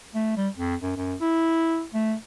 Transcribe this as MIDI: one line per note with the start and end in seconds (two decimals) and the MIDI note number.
0.15 0.36 57
0.37 0.49 55
0.55 0.75 41
0.82 0.93 42
0.97 1.15 42
1.21 1.84 64
1.94 2.14 57